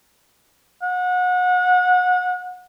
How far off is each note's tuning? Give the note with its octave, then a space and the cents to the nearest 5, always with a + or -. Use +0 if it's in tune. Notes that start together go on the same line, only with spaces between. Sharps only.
F#5 -30